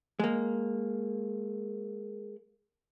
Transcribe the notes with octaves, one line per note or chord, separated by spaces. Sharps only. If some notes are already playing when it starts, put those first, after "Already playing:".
G#3 A#3